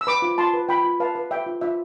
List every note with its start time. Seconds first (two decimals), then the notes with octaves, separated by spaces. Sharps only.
0.01 E6
0.07 B4 B5 D6
0.22 F4
0.38 F4 A5 C6
0.54 B4
0.69 F4 G5 B5
0.85 F4
1.00 B4 F5 A5
1.15 B4
1.31 B4 E5 G5
1.46 F4
1.61 F4 E5